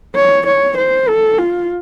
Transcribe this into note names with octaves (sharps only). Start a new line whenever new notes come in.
C#5
C#5
C5
A4
F4